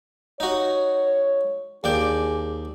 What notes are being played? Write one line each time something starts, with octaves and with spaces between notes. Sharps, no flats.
D#4 F#4 C#5
D#2 D4 G#4 G5